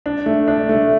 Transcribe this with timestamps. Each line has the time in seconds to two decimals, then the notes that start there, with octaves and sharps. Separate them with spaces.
0.06 D4
0.26 A3
0.48 D4
0.69 A3